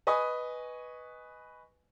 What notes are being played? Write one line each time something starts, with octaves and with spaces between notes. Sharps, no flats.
B4 D#5 G#5 C#6 D#6